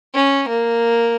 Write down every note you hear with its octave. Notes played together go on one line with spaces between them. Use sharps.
C#4
A#3